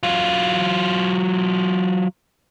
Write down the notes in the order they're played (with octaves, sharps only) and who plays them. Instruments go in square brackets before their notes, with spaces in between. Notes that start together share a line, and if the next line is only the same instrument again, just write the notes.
[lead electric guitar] F#3 F4